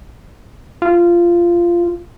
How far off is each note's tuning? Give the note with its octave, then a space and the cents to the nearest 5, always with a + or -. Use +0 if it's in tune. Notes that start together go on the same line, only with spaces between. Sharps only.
F4 -15